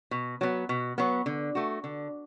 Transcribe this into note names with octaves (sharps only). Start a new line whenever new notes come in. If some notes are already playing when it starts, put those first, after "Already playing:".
B2
F#3 B3
B2
F#3 B3
D3
A3 F#4
D3